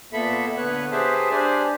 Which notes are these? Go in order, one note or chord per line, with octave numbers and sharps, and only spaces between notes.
A#2 A#3 B3 A4 E5 B5
D3 B3 B4 C#5 F#6
G4 G#4 B4 C5 E5 A5
D4 G4 C5 D5 G#5